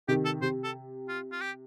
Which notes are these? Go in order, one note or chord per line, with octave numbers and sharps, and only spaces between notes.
C3 D#3 G4
A4
C3 C5
A4
F4
F4
G4